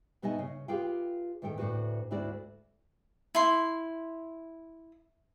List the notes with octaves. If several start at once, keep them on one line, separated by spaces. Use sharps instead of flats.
B2 B3 D#4 D#5 E5 G#5
C#3
F4 G4 G#4 B4 F5 G5
E2 A2 D#3 A4 G5
D2 A2 F#4 B4
D2 G#2 E4 F#4 D5
E4 C6